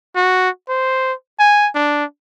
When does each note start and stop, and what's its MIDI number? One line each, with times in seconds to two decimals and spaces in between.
0.16 0.49 66
0.69 1.13 72
1.39 1.68 80
1.75 2.04 62